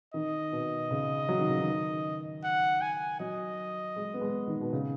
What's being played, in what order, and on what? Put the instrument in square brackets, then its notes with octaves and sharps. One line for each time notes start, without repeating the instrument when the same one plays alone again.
[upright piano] D#3 [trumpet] D#5
[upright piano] B2
C#3
F#3
D#3
C#3
D#3
[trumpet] F#5
G#5
[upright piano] F#3 [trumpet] D#5
[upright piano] G#3
B3
G#3
D#3
B2
C#3